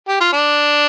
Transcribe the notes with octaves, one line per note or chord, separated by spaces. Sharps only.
G4
F4
D4